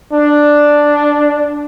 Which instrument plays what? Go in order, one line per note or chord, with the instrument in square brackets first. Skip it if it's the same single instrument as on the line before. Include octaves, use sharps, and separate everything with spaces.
[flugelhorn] D4